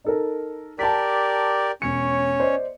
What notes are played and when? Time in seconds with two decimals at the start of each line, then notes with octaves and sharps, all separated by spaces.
0.05 D#4 A4 A#4
0.79 G4 A#4 D5 A5 B6
1.82 E1 C#4 C#5 C#7
2.40 C5 D5 D#5